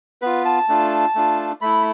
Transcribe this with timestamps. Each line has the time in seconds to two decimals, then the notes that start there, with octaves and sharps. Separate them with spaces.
0.22 B3 F4 B4
0.45 A5
0.68 A3 D4 F4
1.15 A3 D4 F4
1.61 A3 E4 B5